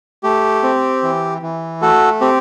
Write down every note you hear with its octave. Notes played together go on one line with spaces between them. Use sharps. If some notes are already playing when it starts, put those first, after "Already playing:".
A3 G4
C4
E3
E3
A3 F#4 A4
C4 G4